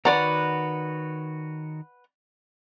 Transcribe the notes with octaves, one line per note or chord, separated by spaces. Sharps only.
D#3 F#4 B4 C#5 D5 F#5 A#5